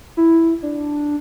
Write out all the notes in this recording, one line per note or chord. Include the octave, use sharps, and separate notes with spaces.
E4
D4